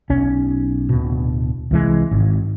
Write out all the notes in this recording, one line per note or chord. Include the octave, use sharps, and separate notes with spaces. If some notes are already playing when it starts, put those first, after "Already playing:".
B1 C#4
D1 B2
C2 E3 G#3
G#1